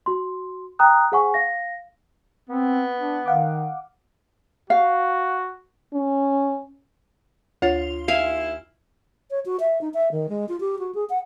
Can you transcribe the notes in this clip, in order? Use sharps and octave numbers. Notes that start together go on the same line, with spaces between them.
F#4 C6
G5 A#5 D#6 F#6
G#4 C5 F#5 G#5 C#6
F5 A#6
B3 C4
D4
D#3 F5 F#5 D6
F#4 F5
C#4
D2 F4 C#5 A6
D#2 E4 F5 G#5
C#5
F#4
E5
D#4
E5
D#3
G#3
F4
G4
F#4
G#4
F#5